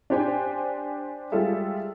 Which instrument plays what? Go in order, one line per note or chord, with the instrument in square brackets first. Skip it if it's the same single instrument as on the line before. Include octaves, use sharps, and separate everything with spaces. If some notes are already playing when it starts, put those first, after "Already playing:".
[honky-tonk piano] D4 G4 C5 G5 G#5
G3 G#3 F4 G#4 A4 E5